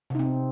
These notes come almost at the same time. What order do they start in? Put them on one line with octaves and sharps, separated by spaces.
C3 D#4 C4